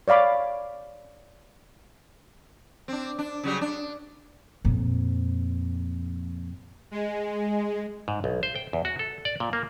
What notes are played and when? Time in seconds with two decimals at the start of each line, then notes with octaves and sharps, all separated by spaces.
0.08 C#5 D5 F5 B5 D6
2.88 C4 D4
3.19 D4
3.44 C#3 F#3 G3
3.61 D4
4.65 F2 A#2
6.91 G#3
8.08 G#2
8.24 B1
8.43 C5
8.56 G5
8.73 E2
8.85 F#4
8.99 A4
9.25 D5
9.40 A#2
9.53 A#3